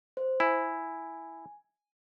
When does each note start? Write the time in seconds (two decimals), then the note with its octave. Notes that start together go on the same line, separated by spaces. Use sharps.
0.17 C5
0.40 E4 G#5